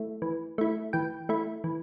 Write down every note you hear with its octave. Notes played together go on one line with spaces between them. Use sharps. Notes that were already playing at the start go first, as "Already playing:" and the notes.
Already playing: A3 E4
E3
A3 E4
E3 G5
A3 E4
E3